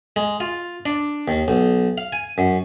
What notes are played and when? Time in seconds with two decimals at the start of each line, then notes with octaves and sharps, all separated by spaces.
0.16 G#3
0.40 F4
0.86 D4
1.28 D#2
1.48 B1
1.98 F5
2.13 G#5
2.38 F#2